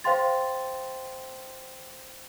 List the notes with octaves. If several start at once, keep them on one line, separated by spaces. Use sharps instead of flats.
C5 F5 G5 C6 A6